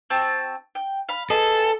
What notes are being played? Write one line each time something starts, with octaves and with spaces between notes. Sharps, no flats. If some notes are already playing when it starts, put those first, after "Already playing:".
C4 F#4 A5
G5
F5 B5
B3 G#4 A4 D#5